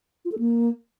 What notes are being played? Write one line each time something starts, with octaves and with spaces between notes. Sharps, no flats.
F4
A4
A#3